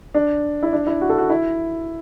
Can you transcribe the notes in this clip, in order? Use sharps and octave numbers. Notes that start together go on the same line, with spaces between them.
D4
E4
D4
E4
F#4
A4
F#4
E4